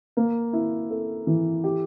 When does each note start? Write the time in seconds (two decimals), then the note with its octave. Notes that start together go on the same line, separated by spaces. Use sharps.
0.17 A#3
0.53 E4
0.90 A4
1.27 E3
1.64 G4